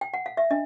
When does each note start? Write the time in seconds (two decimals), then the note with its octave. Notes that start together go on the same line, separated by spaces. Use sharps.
0.01 G5
0.14 F#5
0.26 F5
0.37 E5
0.51 D4 D#5